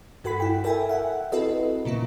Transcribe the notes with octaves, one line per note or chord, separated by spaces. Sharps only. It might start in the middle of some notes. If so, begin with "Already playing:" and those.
G2 F#4 A4 F#5 B5 B6
E4 G5
A4 A#4 E5 G5 G#5
E5 F#5 G5
C4 E4 F#4 A4 B4 D#5
A#2 C#3 A#3 E4